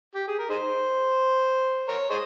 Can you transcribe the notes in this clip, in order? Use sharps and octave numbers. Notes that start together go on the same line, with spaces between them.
G4
G#4
A#4
D#4 G#4 C5
A#4 C#5
G#4 C5 D#5